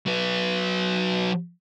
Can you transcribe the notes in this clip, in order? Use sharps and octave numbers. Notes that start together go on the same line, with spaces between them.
F#3 B4